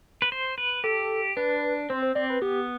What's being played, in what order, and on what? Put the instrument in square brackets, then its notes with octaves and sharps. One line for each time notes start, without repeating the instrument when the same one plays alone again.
[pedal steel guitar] B4
C5
B4
[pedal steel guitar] G4 [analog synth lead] A4
[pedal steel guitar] D4 [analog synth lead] B4
[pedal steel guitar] C4 [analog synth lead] C5
[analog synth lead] C5
[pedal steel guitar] C4 [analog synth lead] D5
[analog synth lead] B4
[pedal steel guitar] B3 [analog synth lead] G4